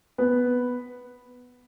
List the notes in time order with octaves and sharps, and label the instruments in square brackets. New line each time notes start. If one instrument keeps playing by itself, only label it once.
[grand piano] B3 B4